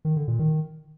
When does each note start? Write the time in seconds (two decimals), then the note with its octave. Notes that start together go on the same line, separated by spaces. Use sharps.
0.05 D#3
0.16 D3
0.28 A#2
0.39 D#3